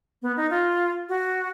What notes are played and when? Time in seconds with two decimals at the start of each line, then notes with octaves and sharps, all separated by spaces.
0.22 B3
0.37 D#4
0.50 F4
1.09 F#4